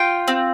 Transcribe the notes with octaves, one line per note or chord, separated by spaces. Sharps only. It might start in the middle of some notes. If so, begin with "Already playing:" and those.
Already playing: F4 G5
C4